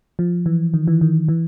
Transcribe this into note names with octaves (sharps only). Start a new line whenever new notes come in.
F3
E3
D#3
E3
D#3
E3